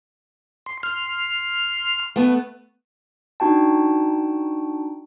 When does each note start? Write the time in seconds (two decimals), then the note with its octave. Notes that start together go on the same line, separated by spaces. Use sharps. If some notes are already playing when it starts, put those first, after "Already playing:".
0.66 C6
0.83 C6 F6
2.16 A3 B3
3.40 D4 D#4 F#4 G5 A5